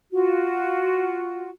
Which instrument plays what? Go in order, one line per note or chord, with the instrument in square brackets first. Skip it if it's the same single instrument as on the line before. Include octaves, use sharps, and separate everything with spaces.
[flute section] F4 F#4